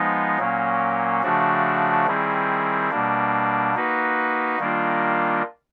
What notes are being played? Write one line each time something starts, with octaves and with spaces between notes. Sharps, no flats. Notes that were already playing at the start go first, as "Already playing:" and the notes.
Already playing: F3 G#3 B3 D#4
A#2 F#3 A#3 C#4
C#3 F3 A3 D4 F#4
D#3 G3 C4 E4 G#4
B2 G3 A#3 D4
A#3 D#4 F#4 B4
D#3 G3 A#3 D4 F4